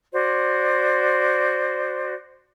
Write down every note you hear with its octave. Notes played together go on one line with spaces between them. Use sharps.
F#4 C5 D5